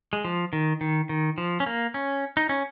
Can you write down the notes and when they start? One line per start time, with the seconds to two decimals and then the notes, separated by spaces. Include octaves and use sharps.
0.13 G#3
0.25 F3
0.53 D#3
0.81 D#3
1.09 D#3
1.38 F3
1.60 C#4
1.66 A#3
1.94 C#4
2.37 D#4
2.49 C#4